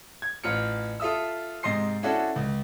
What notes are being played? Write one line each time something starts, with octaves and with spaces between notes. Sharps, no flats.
G#6
A1 F4 F6 C#7
F4 A4 E5 D#6 E6
G#2 C3 D#5 C6 C7
C#4 D4 E4 F#4 A4
C#2